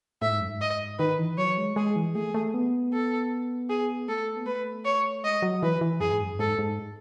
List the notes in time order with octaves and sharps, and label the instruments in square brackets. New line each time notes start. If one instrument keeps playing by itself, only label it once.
[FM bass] A2 [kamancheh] E5
[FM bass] G#2
F#2
G#2
[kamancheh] D#5
[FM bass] D#3 [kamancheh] B4
[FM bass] E3
[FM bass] F#3 [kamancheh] C#5
[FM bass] G#3
[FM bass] G#3 [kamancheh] G#4
[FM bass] E3
[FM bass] A3 [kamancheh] G#4
[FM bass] A3
B3
[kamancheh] A4
G#4
[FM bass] A3 [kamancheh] A4
[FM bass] B3
[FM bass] A3 [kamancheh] B4
[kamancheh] C#5
[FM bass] G#3 [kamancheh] D#5
[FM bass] F#3
[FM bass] E3 [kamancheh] B4
[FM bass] E3
[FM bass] F#2 [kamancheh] G#4
[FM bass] G#2
F#2
[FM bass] G#2 [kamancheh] A4
[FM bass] G#2